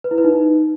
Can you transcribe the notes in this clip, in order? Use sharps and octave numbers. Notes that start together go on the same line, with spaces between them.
B4
E4
B4
D#4